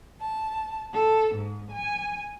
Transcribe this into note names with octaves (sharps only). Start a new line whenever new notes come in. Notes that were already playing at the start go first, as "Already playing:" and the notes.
A5
A4
G#2
G#5